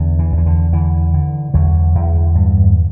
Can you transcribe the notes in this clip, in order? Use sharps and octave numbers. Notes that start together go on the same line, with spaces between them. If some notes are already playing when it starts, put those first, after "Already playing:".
Already playing: E2 D3
E3
E2
E3
D3
D3 E3
D3
E2 D3 F#3
E2
G2